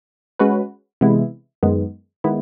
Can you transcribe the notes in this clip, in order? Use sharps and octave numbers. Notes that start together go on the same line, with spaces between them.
G#3 C#4 F#4 B4
C3 E3 G#3 B3 E4
F#2 D#3 G#3 B3
D#3 G#3 B3 E4